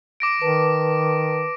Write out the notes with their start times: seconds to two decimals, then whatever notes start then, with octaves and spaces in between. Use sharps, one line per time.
0.20 D6 A#6 D7
0.42 D#3 B4 A5